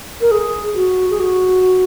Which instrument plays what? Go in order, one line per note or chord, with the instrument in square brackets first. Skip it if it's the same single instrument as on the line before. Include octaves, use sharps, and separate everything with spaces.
[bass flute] A#4
G#4
F#4
G#4
F#4